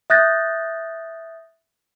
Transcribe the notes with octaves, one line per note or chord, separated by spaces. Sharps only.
E5 D#6 F#6 G6 A6 A#6